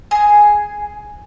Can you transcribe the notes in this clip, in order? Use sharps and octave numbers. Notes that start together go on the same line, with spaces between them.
G#4